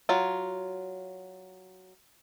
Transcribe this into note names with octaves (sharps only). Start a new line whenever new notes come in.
F#3 F4